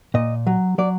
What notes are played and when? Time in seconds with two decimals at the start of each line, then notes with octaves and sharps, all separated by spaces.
0.14 A#2 D#5
0.47 F#3
0.78 F#3 D5